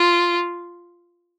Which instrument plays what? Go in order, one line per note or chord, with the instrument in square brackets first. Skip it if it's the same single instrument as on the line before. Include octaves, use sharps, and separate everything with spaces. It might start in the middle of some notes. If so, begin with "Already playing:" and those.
Already playing: [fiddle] F4